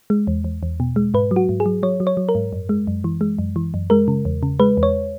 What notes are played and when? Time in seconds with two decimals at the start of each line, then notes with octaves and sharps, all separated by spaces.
0.10 G#3
0.27 E2
0.44 E2
0.63 E2
0.80 B2
0.96 G#3
1.14 G#2 B4
1.31 F#3
1.36 F#4
1.49 G#2
1.60 G#4
1.66 F#3
1.83 F#3 C#5
2.00 F#3
2.07 C#5
2.17 F#3
2.29 A#4
2.35 G#2
2.53 F#2
2.69 G#3
2.87 F#2
3.04 E3
3.21 G#3
3.39 F#2
3.56 E3
3.74 F#2
3.90 G#3 A#4
4.08 C#3
4.25 E2
4.43 C#3
4.60 G#3 B4
4.77 E2
4.83 C#5